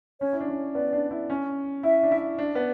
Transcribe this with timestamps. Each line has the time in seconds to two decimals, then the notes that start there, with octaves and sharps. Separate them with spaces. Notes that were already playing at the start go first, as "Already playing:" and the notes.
0.20 C#4 C#5
0.33 E4
0.40 D4
0.48 C#4
0.75 B3 D5
0.93 D4
1.11 E4
1.30 C#4
1.83 E4 E5
2.03 D4
2.11 E4
2.38 D4
2.55 B3